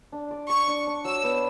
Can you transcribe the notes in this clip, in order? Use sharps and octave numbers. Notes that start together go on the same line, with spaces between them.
D4
D5
D5 C#6
D4
D4
F#3 E6
B3